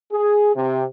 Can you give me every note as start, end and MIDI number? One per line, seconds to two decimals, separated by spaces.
0.12 0.55 68
0.55 0.86 48